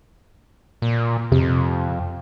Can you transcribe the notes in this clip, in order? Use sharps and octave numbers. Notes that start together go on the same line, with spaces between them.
A#2
F2 C3